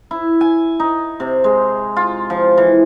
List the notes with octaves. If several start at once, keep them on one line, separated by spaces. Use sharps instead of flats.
E4
G#5
D#4
C3
G#3
F4
F3
E3